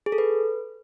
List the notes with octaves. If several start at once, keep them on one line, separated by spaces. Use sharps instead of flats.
G#4
A4
B4